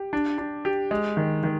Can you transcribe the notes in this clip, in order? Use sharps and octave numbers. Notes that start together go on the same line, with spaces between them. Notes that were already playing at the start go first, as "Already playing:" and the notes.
Already playing: G4
D4
D4
G4
G#3
D#3
D#3